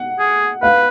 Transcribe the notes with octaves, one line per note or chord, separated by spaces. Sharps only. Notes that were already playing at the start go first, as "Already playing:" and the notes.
Already playing: F#5
G#4
B4 F5